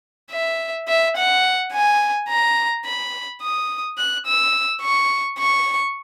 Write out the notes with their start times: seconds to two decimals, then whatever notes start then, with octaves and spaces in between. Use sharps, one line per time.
0.32 E5
0.88 E5
1.17 F#5
1.73 G#5
2.29 A#5
2.85 B5
3.42 D#6
3.98 F#6
4.26 E6
4.82 C#6
5.39 C#6